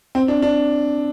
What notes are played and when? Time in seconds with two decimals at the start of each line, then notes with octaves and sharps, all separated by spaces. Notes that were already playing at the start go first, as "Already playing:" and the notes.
0.15 C4
0.28 D4
0.42 D4